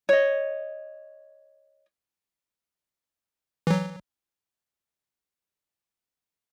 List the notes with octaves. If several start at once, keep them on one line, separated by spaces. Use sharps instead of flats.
C#5 D#5
E3 F#3